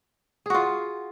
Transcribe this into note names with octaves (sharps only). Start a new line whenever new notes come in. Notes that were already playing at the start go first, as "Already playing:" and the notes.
F4 F#4 G#4